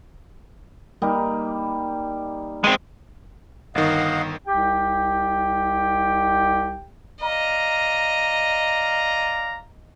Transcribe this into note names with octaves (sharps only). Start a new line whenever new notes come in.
G3 A#3 D#4
G#3 C4 C5 C6
G1 D#3 D#5 F5 F#5
C2 D#4 G4 G5
D5 D#5 F5 A#5